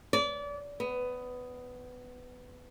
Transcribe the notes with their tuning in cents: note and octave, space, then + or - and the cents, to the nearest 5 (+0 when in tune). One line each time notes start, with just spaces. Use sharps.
D5 -30
B3 +15